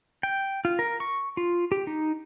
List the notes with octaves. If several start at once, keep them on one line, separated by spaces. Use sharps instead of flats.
G5
F4
A#4
C#6
F4
G4
D#4